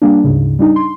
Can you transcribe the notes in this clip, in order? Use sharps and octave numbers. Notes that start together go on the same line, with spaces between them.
G3 A#3 D4
D2 G#2 C#3
G3 D4 D#4
C6